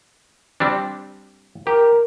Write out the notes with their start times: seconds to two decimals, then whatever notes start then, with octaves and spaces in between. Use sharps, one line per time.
0.60 G3 C4 D4
1.67 G4 A#4